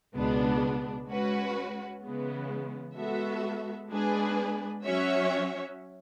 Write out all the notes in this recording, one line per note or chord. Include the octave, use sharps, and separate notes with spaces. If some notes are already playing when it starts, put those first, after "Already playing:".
C#2 B2 G#3 B3 D4
G#3 C#4 F#4 B4
C#3 E3 G#3 B3
G#3 B3 F#4 A4 E5
G#3 B3 D4 G#4 B4
F#3 C#4 F#4 C#5 E5